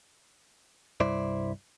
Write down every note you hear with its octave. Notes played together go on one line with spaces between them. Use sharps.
C2 G2 E4 C5 D5